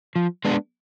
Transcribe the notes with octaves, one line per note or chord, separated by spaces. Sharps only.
F3
G#3 B3 D4